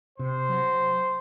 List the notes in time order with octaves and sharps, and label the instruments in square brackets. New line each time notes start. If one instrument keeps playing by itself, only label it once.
[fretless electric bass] C3 [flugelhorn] C5
[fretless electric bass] F#3